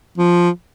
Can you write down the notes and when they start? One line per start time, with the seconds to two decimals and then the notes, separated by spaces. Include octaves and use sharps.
0.18 F3